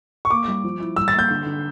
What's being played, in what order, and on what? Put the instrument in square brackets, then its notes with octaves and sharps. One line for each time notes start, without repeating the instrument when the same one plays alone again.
[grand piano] C#6
[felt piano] A#3 [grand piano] D6
[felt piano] G3
F3
E4
[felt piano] G3 [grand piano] E6
[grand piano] A6
[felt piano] A#3 [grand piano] G6
[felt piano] D3
D3